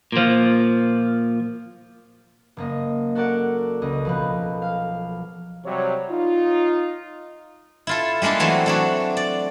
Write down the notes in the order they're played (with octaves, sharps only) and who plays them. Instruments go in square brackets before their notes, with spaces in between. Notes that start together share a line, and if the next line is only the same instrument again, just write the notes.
[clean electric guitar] A#2 F3
[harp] F#1 A#3 D#5
F#4 A4 A#4 D5 F#5
C#2 D#5
B1 F3 B4
F5
[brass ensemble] C3 F#3 G3 C#5
D#4 F4
[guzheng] E4 F4 A4
G3 G#3 A#3 D4 A4
E3 F#3 A3 C4
A3 D4 F#4
D5